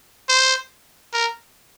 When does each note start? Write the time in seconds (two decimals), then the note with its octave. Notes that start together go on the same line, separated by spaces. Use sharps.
0.29 C5
1.14 A#4